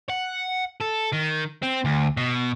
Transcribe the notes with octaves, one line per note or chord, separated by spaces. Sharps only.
F#5
A4
D#3
C4
D2
B2